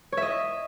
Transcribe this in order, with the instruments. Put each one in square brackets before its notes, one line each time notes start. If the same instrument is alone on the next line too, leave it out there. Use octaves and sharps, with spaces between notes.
[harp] C#5
E5
D#5